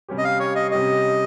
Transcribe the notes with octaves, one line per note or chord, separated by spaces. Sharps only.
C3 G3 C#4 G4
D#5
F5
C#5
D#5
C3 G3 C#4 G4 D#5